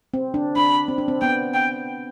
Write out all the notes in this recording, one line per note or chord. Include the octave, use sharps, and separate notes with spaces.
C4
D4
D4 B5
C4
D4
C4
B3 G5
G5